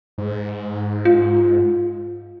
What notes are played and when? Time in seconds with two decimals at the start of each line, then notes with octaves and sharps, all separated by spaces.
0.18 G#2
1.05 F4